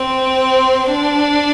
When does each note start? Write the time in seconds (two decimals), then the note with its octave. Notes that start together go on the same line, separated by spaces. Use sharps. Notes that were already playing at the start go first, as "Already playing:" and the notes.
Already playing: C4
0.88 D4